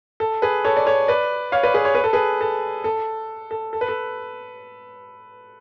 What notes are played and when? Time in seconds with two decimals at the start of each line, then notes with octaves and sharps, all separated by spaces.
0.20 A4
0.42 G#4 B4
0.65 A4 C#5
0.77 D5
0.86 A4 C#5
1.08 B4 D5
1.52 C#5 F5
1.63 B4 D5
1.74 G#4 B4
1.85 C#5
1.95 B4
2.04 A4
2.13 G#4 B4
2.41 A4
2.84 A4
3.51 A4
3.73 A4
3.81 B4
3.88 A4